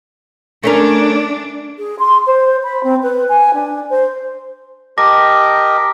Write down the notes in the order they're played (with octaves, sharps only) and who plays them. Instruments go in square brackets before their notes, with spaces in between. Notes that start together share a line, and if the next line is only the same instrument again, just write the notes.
[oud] A3 C#4 A#4 [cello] D4
[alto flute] G#4
C6
C5
B5
C4
B4
G#5
D4
C5
[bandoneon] G4 A#4 D#5 [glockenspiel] A5 D6 A#6